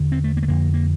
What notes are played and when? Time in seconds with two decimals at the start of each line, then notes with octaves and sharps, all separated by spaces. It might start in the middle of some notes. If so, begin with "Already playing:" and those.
Already playing: E2 D3
0.12 C4
0.24 A3
0.37 A#3
0.43 A3
0.48 F2 D3 A#3
0.74 A#3